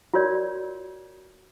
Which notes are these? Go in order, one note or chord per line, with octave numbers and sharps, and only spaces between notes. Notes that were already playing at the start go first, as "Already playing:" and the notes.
F4 F#4 A#4 C#5 D5